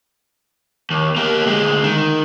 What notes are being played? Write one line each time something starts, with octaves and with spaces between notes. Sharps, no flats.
D#2
A#3 G4
D2 G#3
D#3